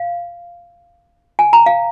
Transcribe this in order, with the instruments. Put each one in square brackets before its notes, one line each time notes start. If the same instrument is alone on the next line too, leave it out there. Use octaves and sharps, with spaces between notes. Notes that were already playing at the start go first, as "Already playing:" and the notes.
Already playing: [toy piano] F5
G#5
A#5
F5